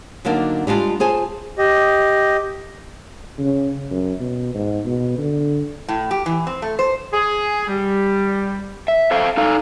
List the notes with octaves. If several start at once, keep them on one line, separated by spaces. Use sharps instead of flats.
D3 F#3 A#3 D4 D#4
G3 G#3 D4 F4
F4 G#4 C5 G#5 A5
G4 D#5
C#3
F#2
B2
G#2
B2
D3
A2
G4
E3
C4
A3
C5
G#4
G3
E5
A4 C5 F5
D#4 A4 F5